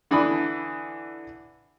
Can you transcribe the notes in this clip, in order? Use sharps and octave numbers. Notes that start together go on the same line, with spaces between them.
D3 E3 D4 B5 D#6